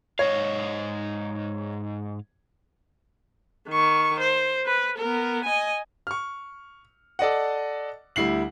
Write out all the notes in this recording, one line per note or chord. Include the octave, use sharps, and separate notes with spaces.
G#2 C#5 D#5 F5
D#3 C#6
C5
B4
B3 A#4
D#5 G#5
C#6 F6
A4 D5 D#5 F#5
D2 G3 E4 C7 F#7